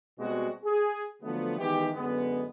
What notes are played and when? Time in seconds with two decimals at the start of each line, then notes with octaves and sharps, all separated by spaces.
0.19 B2 G3 G#3 C4 F#4
0.64 G#4
1.23 D3 F3 F#3 A3 B3
1.58 D#3 E3 G#3 B3 G4
1.94 F#2 D3 G#3 B3